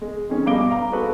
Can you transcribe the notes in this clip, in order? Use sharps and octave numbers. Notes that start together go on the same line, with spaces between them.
G#3
F2 C#4 G#4
G2 B2 F5 D6 D7 G7
F5 A#5
F#4 G#4 A4 B4